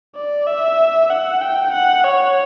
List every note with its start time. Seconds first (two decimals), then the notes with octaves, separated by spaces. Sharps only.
0.16 D5
0.47 E5
1.10 F#5
1.41 G5
1.73 F#5
2.04 C#5